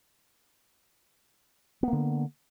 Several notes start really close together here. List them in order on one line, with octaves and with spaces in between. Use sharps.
B3 A#3 D3